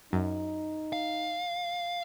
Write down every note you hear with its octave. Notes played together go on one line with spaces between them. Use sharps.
F#2 D#4
F5